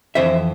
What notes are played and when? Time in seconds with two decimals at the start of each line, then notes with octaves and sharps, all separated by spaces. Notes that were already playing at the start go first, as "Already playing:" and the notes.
0.15 F2 E3 C5 E5